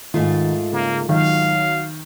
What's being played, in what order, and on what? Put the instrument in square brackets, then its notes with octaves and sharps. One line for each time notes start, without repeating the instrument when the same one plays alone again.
[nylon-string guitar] G#2 A3 F4 [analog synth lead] D#3
[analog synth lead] C#3 [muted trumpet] A#3
[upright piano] D#3 [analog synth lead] F#3 [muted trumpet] F5